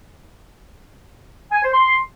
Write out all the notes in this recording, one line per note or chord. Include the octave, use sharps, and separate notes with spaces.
G#5
C5
C6